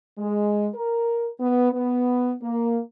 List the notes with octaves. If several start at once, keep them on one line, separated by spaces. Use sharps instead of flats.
G#3
A#4
B3
B3
A#3